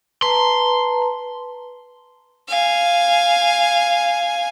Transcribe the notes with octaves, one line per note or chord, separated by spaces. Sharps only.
B4 A5 A#5 C6
F5 G#5